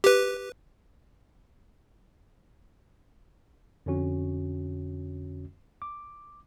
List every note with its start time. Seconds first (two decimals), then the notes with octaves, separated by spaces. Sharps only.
0.04 G4 B4
3.86 F2 D3 C#4 F#4
5.82 D6